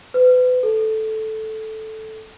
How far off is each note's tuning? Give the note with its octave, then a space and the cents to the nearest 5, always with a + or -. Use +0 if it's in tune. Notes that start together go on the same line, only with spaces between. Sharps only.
B4 +35
A4 -5